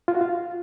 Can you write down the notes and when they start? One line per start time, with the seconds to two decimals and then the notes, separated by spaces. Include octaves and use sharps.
0.08 F4
0.14 F#4
0.21 F4